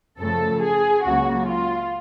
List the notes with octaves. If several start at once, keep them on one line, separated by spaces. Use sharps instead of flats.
F#2 C#3 F3 A3 A4
G#4
C#2 C#3 F#3 A#3 F#4
F4